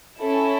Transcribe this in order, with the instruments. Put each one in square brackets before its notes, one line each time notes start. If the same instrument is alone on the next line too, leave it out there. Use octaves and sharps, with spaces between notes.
[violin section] C#4 E4 A4